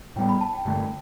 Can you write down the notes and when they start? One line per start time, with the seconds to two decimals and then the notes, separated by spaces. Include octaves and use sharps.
0.16 A2 G3 B3 G5
0.29 B5
0.41 A5
0.53 G5
0.65 G2 D3 A3 G5